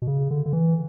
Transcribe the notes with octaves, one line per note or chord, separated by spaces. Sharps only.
B2
C#3
D3
D3
E3